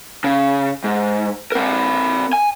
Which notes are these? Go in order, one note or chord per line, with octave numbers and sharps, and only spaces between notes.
C#3
G#2
C4 A#4
G#5